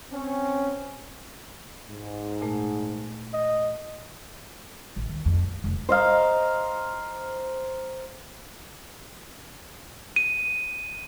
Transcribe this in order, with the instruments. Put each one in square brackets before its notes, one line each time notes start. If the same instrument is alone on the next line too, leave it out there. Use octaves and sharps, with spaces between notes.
[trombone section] C4 C#4
[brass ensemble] G#2
[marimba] A#2 A3
[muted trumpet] D#5
[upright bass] A1
D#2
F2
A#2
F1
[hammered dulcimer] C5 D#5 F5 A#5
[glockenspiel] D#7